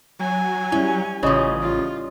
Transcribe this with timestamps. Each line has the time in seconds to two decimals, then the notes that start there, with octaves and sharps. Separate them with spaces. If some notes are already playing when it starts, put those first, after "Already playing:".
0.19 F#3 G#5
0.72 G3 C#4 E4
1.23 A1 C#3 F3 C#4 D5 D#5
1.62 F4